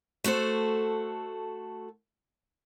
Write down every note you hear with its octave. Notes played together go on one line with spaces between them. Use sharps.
A3 F#4 A4 C5